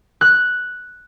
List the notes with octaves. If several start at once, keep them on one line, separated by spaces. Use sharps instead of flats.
F#6